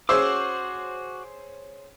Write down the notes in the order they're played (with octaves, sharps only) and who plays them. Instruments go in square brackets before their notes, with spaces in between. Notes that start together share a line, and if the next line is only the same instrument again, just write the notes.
[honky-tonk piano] C#4 G#4 C5 [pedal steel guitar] F#4 C#6 D6 [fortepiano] E6